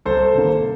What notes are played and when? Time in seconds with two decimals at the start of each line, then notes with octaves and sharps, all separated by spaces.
0.05 C2 A4 C5
0.35 C3 D#3 A#3